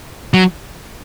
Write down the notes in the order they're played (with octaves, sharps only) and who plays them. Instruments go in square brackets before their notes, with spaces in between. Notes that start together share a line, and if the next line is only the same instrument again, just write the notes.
[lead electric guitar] F#3